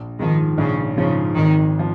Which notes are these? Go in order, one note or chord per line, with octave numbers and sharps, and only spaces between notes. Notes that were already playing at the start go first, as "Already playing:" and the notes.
Already playing: A#1
G#2 D#3 F3
A#1 C#3
G#2 C#3 F3
G#1 D#3
F3